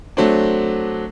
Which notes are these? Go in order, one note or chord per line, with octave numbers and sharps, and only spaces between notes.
F#3 A3 C4 D4